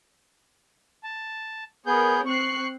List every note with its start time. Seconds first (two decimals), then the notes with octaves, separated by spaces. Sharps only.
1.03 A5
1.86 B3 G#4 A#4 C#5 G6
2.26 C4 C#6 F#6 C7